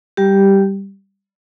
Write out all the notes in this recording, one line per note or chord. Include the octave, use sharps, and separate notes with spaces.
G3 G4